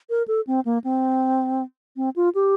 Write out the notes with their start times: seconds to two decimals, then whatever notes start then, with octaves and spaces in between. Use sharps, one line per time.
0.10 A#4
0.28 A4
0.47 C4
0.65 A#3
0.84 C4
1.97 C4
2.16 F4
2.35 G4